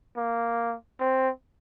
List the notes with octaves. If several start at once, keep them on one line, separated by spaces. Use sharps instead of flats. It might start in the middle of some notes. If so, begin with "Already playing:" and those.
A#3
C4